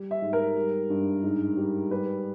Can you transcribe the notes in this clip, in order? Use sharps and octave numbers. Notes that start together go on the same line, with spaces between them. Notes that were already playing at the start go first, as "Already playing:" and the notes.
Already playing: G3
E5
G#2
A#4
G3
G2
G#2
G3
G3 B4